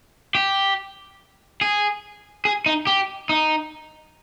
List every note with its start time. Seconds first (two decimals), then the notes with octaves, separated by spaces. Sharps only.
0.35 G4
1.61 G#4
2.45 G#4
2.66 D#4
2.87 G4
3.29 D#4